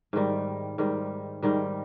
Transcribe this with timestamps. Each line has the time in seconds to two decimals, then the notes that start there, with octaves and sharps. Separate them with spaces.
0.13 G#2 D#3 G3
0.78 G#2 D#3 G3
1.43 G#2 D#3 G3